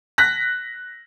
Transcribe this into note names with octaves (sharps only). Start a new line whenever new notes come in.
F#6 A#6 B6